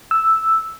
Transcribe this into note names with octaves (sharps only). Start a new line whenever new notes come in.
E6